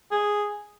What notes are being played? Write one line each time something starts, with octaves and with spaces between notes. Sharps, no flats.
G#4